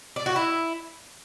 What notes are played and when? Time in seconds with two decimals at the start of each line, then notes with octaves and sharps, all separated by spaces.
0.16 D5
0.26 F#4
0.36 E4